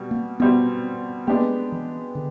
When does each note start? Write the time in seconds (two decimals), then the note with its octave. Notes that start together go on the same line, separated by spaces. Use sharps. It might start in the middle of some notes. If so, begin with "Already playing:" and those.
Already playing: B2 G3
0.11 A#3
0.40 B2 G3 B3 C4
1.27 G#3 A#3 B3 D4 G4
1.72 E3
2.15 D3